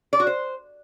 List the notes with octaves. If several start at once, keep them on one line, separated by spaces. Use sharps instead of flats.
D5
F#4
C5